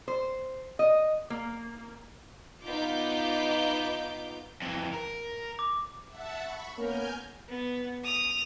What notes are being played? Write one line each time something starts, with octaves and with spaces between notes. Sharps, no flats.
C5
D#5
A#3
B3 D#4 F4 D6 G6
F2 E3
A#4
D6
E5 F#5 A5
B5 C#6
A#3 B3 C#4 A#4 G#5 F6 G6
B3
D#6 F7